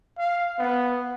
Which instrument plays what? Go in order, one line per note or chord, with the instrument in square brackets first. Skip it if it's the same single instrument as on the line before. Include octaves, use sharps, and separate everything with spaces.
[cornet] F5
B3